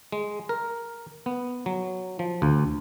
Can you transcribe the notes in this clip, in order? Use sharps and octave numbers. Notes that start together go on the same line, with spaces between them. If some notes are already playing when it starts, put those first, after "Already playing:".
G#3
A#4
B3
F#3
F3
D2